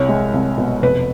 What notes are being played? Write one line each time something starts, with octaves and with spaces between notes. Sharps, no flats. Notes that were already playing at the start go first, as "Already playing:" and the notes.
Already playing: C2 C#5
G#3
C2
B2
F1 B4